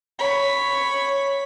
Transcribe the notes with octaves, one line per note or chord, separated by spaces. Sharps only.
C#5 B5